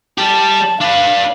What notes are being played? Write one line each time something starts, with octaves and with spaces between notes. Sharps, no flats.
G3 G4 A5
D4 B4 F5